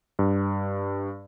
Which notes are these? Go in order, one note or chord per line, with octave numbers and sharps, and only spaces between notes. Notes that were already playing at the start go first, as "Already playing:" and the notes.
G2